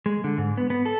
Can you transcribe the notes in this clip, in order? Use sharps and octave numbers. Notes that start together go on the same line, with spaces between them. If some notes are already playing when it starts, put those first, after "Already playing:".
G#3
D3
G#2
B3
B3
A4